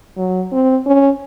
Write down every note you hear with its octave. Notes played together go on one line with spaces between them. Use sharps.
F#3
C4
C#4